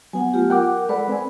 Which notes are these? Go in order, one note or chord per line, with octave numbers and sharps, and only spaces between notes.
F#3 B3 F#5 G#5
A3 F4 G4
A#4 F#5 G5 D6
G#3 A4 B4 D5 F#5 B5
C4 G#5